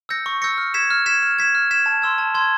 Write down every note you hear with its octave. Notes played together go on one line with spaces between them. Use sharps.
E6 G6 A#6 C#7
C#6
E6 G6 A#6 C#7
F6
G#6 B6 E7
F6
G#6 B6 E7
F6
G#6 B6 E7
F6
G#6 B6 E7
A5
C6 E6 G#6
A5
C6 E6 G#6